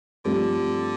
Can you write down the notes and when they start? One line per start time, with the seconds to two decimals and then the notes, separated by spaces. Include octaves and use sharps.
0.25 G2 D3 F3 A3 C4 G4